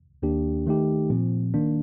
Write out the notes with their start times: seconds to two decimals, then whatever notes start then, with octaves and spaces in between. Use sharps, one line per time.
0.22 D#2 D#3 A#3 D4 G4
0.66 D#3 A3 D#4 G4
1.10 A#2 F3 C4
1.54 D#3 A#3 D4